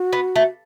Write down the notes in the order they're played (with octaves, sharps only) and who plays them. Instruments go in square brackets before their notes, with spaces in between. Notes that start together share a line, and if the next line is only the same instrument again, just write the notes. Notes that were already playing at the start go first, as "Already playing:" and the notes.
Already playing: [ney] F#4
[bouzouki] B3
A3